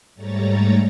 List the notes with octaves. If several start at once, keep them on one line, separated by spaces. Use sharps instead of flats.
G#2 G3 A3 C#5 A#5 A6